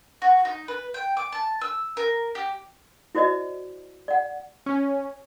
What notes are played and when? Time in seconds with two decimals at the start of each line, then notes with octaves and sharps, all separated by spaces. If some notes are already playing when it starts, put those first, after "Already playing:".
0.22 F#4
0.45 D#4
0.68 B4
0.94 G5
1.17 D6
1.32 A5
1.61 E6
1.97 A#4
2.35 G4
3.15 E4 F#4 C5 D5 D#5
4.08 D5 F#5
4.66 C#4